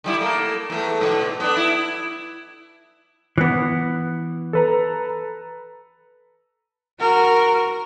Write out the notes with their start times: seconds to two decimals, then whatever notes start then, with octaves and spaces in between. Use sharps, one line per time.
0.04 D3 G3 E4
0.21 A3 A#3
0.70 E2 A3
1.01 G#2 B2 D3
1.40 B3 D4
1.57 E4
3.38 E3 B3
4.53 A4 B4 A#5
6.99 F#4 A#4